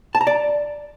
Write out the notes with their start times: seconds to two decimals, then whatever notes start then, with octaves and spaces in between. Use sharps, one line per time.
0.15 A5
0.21 A#5
0.27 D5